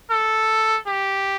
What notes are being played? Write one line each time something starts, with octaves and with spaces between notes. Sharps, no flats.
A4
G4